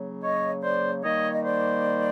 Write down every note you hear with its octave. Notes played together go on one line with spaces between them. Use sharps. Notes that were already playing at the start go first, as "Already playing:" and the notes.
Already playing: C#3 F#3 A#3
C#5 D#5
C5 D5
D#3 G3 A#3 C#5 D#5
D#5
C5 D5